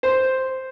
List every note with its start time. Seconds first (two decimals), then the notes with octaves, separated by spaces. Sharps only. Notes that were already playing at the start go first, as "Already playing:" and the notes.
0.03 C5